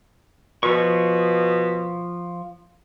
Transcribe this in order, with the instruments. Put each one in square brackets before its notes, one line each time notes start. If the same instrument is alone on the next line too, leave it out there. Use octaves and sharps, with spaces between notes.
[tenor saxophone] B2 [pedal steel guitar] F3 C#6